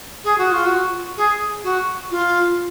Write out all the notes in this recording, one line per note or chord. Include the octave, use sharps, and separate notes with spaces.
G#4
F#4
F4
F#4
G#4
F#4
F4